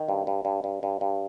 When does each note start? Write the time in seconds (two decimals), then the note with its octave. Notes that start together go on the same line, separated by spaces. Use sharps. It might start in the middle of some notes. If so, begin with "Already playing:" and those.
Already playing: D#3
0.09 G2
0.27 G2
0.45 G2
0.64 G2
0.83 G2
1.01 G2